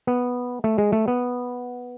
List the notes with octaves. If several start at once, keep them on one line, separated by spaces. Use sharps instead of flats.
B3
A3
G#3
A3
B3